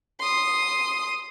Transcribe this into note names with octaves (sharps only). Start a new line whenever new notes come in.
C6 D#6